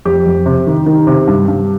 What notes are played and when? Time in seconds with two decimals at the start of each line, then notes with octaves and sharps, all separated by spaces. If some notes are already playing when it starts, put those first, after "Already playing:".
0.05 F2 G4
0.26 F2
0.46 C3
0.67 D#3
0.86 D#3
1.07 C3
1.27 G2
1.48 G2